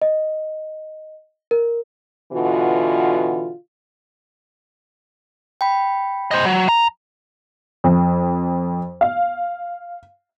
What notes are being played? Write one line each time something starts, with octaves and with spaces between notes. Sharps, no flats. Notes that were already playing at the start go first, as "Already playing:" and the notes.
D#5
A#4
B2 D3 E3 F4 F#4
G5 B5
C5 D#5
F#3
A#5
F2
F5